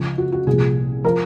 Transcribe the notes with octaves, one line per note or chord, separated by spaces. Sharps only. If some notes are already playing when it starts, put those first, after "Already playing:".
Already playing: C#2 C#3 F3
F#4
F#4
C2 A#2 F3 G#4
F3 A#4